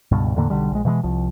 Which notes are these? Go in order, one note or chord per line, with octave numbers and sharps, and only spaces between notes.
C#2 G2 B2
E2 A2 D3 A#3
B1 D3 G3
A#1 G#3
B2 E3 F3 G#3
C2 F3